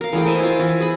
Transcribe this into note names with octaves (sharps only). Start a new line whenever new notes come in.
A#4 F5
E3 A3 G#4 G5
A#4 C5 D#5 E5
E4 F4
E3 G#5
G#4 B5